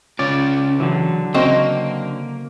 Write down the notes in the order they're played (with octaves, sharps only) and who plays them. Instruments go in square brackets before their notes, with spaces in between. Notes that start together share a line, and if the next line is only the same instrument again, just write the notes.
[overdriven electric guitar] C#3 F4 [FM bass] C#4 [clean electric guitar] D5
[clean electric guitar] D3 F#3 [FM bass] E3
[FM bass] C#3 [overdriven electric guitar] A#3 [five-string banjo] C4 F#4 D#5